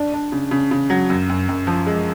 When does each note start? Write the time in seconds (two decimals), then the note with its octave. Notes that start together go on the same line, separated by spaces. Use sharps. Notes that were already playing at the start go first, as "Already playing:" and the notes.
Already playing: D4
0.14 D4
0.32 C#3
0.51 C#3
0.71 C#3
0.90 F#3
1.10 F#2
1.29 F#2
1.49 F#2
1.67 F3
1.86 G#3